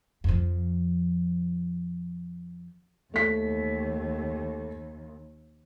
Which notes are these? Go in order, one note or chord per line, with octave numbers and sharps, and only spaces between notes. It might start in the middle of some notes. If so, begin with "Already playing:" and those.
F2 F3
D#2 A3 B6